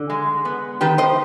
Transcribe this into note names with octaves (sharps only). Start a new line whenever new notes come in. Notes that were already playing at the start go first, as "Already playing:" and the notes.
Already playing: D3
G#3
B3
D#3 G4 B4
C5 D#5